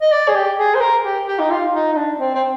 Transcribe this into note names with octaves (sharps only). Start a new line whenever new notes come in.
D#5
D5
G#4
G4
G#4
C5
A#4
G4
G4
D#4
F4
D#4
D#4
D4
C4
C4